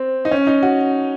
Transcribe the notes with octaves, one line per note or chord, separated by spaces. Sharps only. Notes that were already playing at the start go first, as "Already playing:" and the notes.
Already playing: C4
D#4
C#4
D#4
F#4